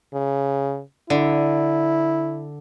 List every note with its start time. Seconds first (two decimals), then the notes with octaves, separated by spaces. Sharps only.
0.14 C#3
1.10 D3 E4